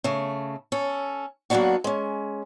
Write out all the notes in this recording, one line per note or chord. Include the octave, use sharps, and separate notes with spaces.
C#3 A3
C#4 A4
F#3 A#3 B3 C#4 D4 F#4
G#3 C#4